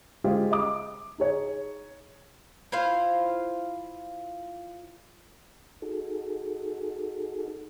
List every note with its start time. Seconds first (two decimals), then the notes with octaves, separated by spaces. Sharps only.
0.24 G#3 F4 G4 G#4 C5 F5
0.51 D#5 D6
1.18 D#4 G#4 C#5
2.72 E4 F4 C5 F5
5.82 D#4 F#4 G#4 A4